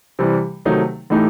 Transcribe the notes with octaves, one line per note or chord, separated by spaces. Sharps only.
C3 E3 G3
C3 D#3 F#3 A3 D#4
A2 E3 A3 D#4 G4